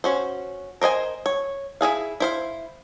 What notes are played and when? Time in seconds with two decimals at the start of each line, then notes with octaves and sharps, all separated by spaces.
0.04 C#4 F#4 C5
0.81 A#4 C5 D#5 G#5
1.26 C#5
1.81 E4 F#4 G#4 F5
2.20 E4 C5 F5